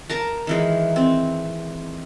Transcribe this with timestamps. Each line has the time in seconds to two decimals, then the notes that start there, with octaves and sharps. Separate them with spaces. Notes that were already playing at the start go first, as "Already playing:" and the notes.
0.10 A#4 A5 A#5
0.47 D#3 E3 G#3
0.96 C4